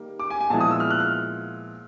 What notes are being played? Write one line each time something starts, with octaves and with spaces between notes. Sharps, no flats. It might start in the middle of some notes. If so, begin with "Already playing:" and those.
Already playing: D#3 G3 A#3
D6
G#5
G#5
A#2 F3 G#3 B3 E4 A5
D#6
E6
F6
F#6
F6